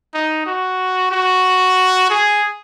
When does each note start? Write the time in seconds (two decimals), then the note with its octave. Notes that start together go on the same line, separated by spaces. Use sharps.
0.14 D#4
0.46 F#4
1.11 F#4
2.10 G#4